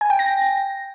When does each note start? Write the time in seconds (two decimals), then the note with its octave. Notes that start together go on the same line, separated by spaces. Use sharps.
0.01 G#5
0.10 G5
0.19 A#6